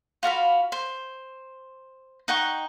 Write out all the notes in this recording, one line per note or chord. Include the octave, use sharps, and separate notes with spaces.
F4 F#4 F5 B5
C5
D#4 F#5 G5 C#6